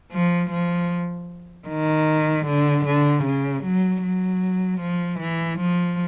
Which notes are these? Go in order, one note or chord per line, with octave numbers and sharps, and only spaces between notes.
F3
F3
D#3
D3
D3
C#3
F#3
F#3
F3
E3
F3